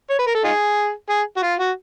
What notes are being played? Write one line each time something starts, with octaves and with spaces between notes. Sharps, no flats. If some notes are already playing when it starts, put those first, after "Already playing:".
C#5
B4
A#4
A4
D#4 F4 G#4
G#4
F#4
F4
F#4